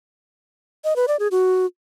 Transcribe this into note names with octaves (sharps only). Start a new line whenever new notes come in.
D#5
B4
D5
G#4
F#4